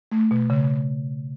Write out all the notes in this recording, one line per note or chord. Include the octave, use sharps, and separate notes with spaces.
A3
B2
C#3